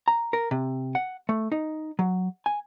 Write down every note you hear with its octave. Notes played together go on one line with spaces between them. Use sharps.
A#5
A#4
C3
F#5
A3
D#4
F#3
G#5